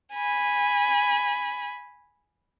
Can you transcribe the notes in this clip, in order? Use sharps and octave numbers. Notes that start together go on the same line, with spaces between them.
G#5 B5